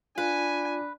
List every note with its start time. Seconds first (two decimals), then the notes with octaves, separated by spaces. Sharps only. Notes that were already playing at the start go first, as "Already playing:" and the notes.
0.18 D4 F4 B4 G#5